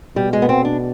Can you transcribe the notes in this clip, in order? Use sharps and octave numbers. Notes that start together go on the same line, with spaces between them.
B2 G3
G#3
B3
C4
D4